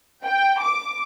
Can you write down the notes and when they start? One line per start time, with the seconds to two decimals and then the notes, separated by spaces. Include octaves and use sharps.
0.24 G5
0.61 D6